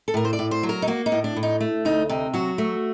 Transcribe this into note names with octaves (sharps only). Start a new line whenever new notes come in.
A4
A2 A#4
C5
D5
A2
C5
F#3
A#4
D#4
A#3 F#4
D#4
A2
D4
A2
D#4
A3
D2 D#4
C3 D#4
F#3 F#4
A3